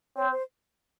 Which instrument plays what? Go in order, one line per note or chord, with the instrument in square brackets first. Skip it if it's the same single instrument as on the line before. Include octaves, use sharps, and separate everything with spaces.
[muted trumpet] C4 [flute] C#5
[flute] C5